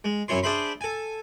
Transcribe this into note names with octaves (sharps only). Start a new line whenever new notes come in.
G#3
F#2 C#4 E4 C#5 C6
D4 G#4 C5 E5 B5 C6
A4 G#5